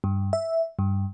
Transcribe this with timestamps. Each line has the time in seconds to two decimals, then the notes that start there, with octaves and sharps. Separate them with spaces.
0.04 G2
0.33 E5
0.79 G2